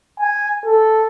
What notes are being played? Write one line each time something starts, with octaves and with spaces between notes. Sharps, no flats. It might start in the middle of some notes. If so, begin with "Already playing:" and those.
G#5
A4